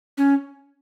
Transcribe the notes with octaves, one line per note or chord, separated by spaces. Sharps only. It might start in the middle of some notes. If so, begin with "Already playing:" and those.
C#4